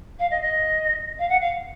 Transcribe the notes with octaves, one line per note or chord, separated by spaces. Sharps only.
F5
D#5
D#5
F5
F#5
F5